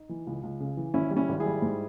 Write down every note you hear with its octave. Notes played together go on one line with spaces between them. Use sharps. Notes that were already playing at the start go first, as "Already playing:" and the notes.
Already playing: D#4
E3
C#2
C#2
C#3
E3
G#1 C#4 E4
G3
C#4 E4
G#1
E4 G#4
G3
G#2